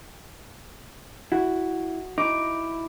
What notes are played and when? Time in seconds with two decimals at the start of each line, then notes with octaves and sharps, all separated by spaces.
1.32 E4 F#4
2.18 D#4 E4 D6